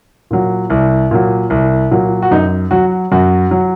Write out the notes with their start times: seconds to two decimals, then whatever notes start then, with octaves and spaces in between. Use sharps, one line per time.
0.31 A#2 F#3
0.70 C2
1.11 A#2 F#3
1.50 C2
1.91 A#2 F#3
2.22 F#4
2.31 F#2 D#4
2.71 F#3 F#4
3.12 F#2 F#4
3.51 F#3